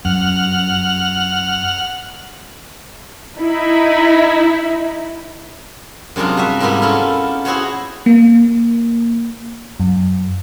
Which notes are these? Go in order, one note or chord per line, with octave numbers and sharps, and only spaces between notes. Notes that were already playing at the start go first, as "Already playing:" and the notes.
F#2 F#5 F6
D#4 E4
F#2 C3 G#3 D4 F4
G3 F#4 E5
G#2 G3 A#3 B3 E4 G4
C#4 E4 F4 A4
E4 F#4 G#4 C5 C#5 F#5
A#3
F#2